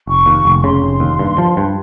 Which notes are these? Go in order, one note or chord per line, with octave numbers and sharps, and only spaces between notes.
F1 C#6
D#2
F1
C#6
C#3 C6
F1
D#2
G2
F3
G2